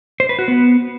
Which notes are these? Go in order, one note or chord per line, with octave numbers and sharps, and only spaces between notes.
C5
B4
F#4
B3